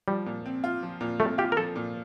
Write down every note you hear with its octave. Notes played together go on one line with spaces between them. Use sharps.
F3 G3
A#2
C4
F4
F3
A#2
A3 C4
F4 G4
A#4
F3 A4
A#2